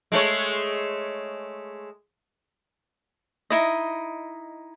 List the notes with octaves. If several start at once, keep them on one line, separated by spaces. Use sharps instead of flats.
G#3 A3 C#5
D#4 E4 D#5